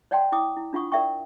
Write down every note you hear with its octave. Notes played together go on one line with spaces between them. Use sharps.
C#5 D5 F#5 G5 A5 C6
E4 G5 D6 D#6
E4
D4 F4 F#5 C#6 D#6
A#4 D5 E5 F#5 G5 C#6